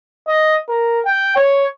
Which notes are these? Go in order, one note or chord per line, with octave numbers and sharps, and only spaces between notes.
D#5
A#4
G5
C#5